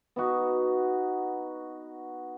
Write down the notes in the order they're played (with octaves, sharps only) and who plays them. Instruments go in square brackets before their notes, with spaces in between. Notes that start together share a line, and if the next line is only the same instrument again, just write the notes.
[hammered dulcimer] B3 D#4 F#4